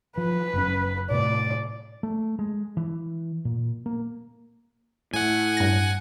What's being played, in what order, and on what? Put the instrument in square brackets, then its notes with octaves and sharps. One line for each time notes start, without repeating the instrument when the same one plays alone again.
[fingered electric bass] F3 [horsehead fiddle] B4
[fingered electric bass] F#1 F#2 C#4
[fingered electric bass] A2 C3 A3 [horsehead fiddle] D5
[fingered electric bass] A3
G#3
E3
A#2
A#3
[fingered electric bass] A2 [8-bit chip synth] F#5 G#5
[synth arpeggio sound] G2 A#6